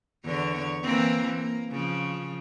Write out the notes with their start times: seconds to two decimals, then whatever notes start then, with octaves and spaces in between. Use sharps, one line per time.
0.24 E2 D3 C#5
0.83 E3 A#3 C4
1.35 A#3
1.71 C#3 F3